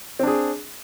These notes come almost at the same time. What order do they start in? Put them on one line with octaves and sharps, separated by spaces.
C4 D4 G#4